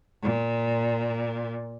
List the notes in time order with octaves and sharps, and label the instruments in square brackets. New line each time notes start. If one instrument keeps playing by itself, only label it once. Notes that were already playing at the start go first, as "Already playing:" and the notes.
[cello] A#2